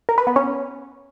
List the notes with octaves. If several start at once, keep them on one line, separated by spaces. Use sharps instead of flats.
A#4
B4
B3
C#4